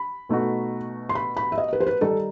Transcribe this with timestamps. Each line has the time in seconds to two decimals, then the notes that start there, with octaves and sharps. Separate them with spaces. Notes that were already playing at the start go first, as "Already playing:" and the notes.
Already playing: B5
0.29 B2 A3 D#4 F#4
1.09 C6
1.15 B5
1.37 B5
1.52 E5
1.58 D#5
1.73 B4
1.80 C5
1.87 B4
2.01 D#3 G3 D#4 G4 A4